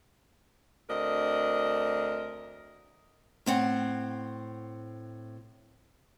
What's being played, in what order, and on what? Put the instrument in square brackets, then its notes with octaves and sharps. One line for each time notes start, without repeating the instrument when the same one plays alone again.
[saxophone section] D2 C4 D4 A#4 D#5
[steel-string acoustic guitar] A2 C4 F#5